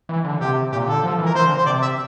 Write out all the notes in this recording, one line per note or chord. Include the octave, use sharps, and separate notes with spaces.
E3
D3
C3 G4
A#2 G4
D3 A4
F3
E3
A#4
E3 C5
D3
C5
C3 D5
E5